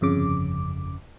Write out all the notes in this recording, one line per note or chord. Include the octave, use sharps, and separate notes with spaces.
G1 F2 C#3 D6